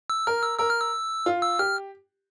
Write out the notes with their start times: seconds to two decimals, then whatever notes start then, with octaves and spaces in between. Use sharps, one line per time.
0.10 E6
0.27 A#4 F6
0.43 E6
0.59 A#4 E6
0.70 F6
0.81 E6
1.26 F4
1.42 E6
1.59 G4 F6